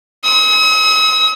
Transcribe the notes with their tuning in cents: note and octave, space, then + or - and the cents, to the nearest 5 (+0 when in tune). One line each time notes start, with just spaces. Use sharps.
D#6 +45